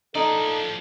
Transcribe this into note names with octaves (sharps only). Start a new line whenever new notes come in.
F3 D#4 A4 D5